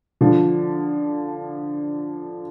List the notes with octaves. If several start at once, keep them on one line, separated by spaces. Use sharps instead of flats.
D3 F3